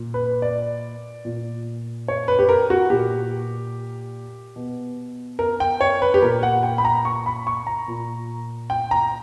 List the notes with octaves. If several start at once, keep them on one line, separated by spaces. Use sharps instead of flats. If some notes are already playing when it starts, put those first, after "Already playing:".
Already playing: A#2
B4
D5
A#2
C#5
B4
G4
A#4
F#4
A#2 G4
B2
A#4
G5
C#5
B4
G4
A#2 A#4
F#5
G5
B5
A#5
C#6
B5
C#6
A#5
A#2
G5
A#5